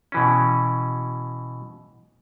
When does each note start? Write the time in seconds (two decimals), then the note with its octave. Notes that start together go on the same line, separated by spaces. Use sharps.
0.12 B2 E3 C#4